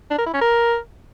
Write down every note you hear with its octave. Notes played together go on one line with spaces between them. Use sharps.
D4
A#4
E4
C#4
A#4